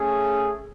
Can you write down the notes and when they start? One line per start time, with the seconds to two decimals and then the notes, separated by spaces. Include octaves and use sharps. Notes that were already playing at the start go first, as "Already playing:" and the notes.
Already playing: A3 C#4 G#4